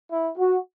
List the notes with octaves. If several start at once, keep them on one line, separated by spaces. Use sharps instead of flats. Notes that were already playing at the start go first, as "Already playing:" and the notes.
E4
F#4